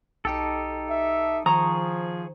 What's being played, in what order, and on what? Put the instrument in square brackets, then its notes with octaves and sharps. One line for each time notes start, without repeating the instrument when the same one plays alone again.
[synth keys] B1 G5 A5 [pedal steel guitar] D#4 G4 A4
[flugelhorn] E5
[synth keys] D#3 C5 [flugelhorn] F3 [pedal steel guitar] G#4 C#6 D#6 [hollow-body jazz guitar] A#5